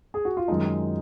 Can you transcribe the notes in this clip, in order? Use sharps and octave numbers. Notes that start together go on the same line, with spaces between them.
G#4
F#4
F4
F#2 D#3 G#3 D#4